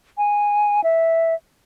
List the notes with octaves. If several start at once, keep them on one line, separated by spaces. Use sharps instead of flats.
G#5
E5